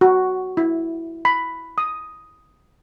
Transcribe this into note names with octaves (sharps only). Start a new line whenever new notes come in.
F#4
E4
B5
D#6